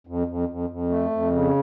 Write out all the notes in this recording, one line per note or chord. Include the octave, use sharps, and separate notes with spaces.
F2
F2
F2
F2
A3
F2
C#3